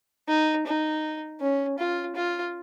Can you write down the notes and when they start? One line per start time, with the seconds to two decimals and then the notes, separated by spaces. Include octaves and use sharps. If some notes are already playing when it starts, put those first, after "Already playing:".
0.28 D#4
0.66 D#4
1.40 C#4
1.78 F4
2.16 F4